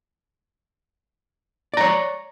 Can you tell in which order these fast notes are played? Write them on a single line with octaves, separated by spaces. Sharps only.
D5 A#5 C#5